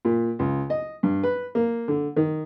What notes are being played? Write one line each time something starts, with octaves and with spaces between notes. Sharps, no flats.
A#2
C#2
D#5
G2
B4
A#3
D3
D#3